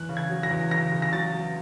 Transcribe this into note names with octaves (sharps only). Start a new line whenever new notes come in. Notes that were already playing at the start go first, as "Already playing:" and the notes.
Already playing: E2 F#6
C#3
G#6
F#3
A#6
E2
C#3 A#6
C#3
A#6
F#3 A6
F#3